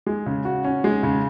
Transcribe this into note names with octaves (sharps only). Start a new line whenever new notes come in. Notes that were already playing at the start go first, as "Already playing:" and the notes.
G#3
C#3
F#4
C#4
G#3
C#3